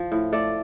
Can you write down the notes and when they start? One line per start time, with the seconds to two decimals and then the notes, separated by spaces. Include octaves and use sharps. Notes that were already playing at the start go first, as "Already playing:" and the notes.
Already playing: F3
0.12 A2
0.33 A3 D5